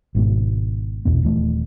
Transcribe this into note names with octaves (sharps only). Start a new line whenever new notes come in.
G#1 G#2 B2
A#1 E2 B2 B3
D#1 E3 A3